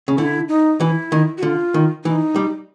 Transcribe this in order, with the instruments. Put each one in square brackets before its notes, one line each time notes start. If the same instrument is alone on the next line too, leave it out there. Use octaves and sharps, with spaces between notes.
[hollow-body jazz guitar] C#3
[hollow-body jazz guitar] D3 [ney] E4
[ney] D#4
[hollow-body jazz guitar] E3 [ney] E4
[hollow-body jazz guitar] D#3
[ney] F#4
[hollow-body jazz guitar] D3 [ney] F4
[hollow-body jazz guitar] D#3
[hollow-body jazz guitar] E3 [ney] D#4
[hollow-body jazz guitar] G3